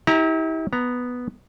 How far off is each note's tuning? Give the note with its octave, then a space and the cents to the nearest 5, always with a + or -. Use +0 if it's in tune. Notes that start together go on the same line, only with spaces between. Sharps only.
E4 -40 G4 +0 A#5 +0
B3 +0 A#5 +0